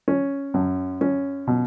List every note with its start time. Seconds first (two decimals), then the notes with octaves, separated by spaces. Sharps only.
0.08 C#4
0.54 F#2
1.01 C#4
1.47 B2